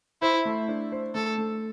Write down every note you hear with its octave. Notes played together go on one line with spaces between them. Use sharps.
E4 C5
A3
D4
C5
A3 A4
A3